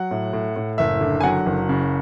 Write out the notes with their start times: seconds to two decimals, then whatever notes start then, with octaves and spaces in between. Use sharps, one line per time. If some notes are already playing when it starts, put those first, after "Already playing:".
Already playing: F#3 F#5
0.11 A2
0.33 A2
0.56 A2
0.78 F#1 E5
1.01 D3
1.21 G#5
1.23 F#3 F#5
1.46 F#1
1.69 C#3